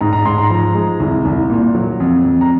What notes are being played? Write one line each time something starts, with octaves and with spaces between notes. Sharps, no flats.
G#2 A#5
A#5
G#2 C6
A#5
F3 A#5
G#3
C2
C2
A#2
F#3
F2
F2
A#5